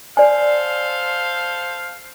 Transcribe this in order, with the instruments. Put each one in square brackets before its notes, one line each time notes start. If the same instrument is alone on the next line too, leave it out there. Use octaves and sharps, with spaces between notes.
[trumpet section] A4 C5 F5 [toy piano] D5 G#5